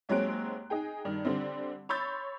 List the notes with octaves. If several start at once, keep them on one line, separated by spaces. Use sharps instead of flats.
D#2 F#3 G#3 C4 F#6 D7
D#4 G#4 G5
G2 D#3
D3 G3 C4
C#5 B5 C6 E6 G6 A6